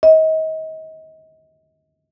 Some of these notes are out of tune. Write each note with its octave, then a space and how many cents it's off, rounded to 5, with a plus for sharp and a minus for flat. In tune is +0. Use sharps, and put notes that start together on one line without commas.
D#5 +35